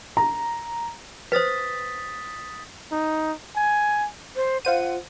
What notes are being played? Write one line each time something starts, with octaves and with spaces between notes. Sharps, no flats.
A#5
B4 C5 D#6 A6 B6
D#4
G#5
C5
F4 C5 F#5 D#7